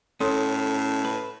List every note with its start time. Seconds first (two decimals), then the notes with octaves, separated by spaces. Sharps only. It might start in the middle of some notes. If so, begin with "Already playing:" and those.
0.21 A2 C#4 A4 C#5 C6
1.05 B4